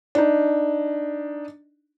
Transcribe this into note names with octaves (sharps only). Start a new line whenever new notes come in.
D4 D#4